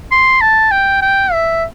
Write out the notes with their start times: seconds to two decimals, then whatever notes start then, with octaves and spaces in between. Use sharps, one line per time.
0.11 C6
0.41 A5
0.71 G5
1.02 G5
1.32 E5